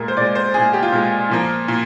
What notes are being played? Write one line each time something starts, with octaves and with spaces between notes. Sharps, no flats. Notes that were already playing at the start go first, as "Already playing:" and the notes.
Already playing: A#2 G#3 A#4
C5
A#2 G#3 D5
C5
A#2 G#3 G#4
G4
F4
A#2 G#3
A#2 F3 A#3
A#2